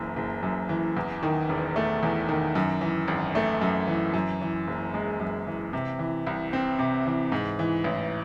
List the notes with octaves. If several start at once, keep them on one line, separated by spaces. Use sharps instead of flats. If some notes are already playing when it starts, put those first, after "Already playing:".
Already playing: F#1 F#2 E3
F#1
F#2
E3
E2
D#3
E1
A3
E2
D#3
F#2
E3
G#1
A3
F#2
E3
F#2
E3
F#1
G#3
F#2
E3
C3
E3
C2
C4
C3
E3
G#2
E3
A1